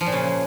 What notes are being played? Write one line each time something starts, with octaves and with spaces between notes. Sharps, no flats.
F3
A#2
C#3